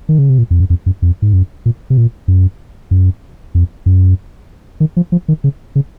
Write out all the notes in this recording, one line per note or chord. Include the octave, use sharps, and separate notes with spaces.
D#3
C#3
C3
A#2
F2
F#2
F2
F#2
F2
G#2
F#2
A#2
C3
A#2
F#2
F#2
F2
F#2
D#3
F3
F3
D#3
C#3
C#3